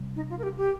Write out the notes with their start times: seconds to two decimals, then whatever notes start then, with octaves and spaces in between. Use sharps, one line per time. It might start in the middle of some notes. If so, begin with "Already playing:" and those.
Already playing: C3 G3
0.16 D#4
0.30 F4
0.38 A#4
0.43 G4
0.57 G4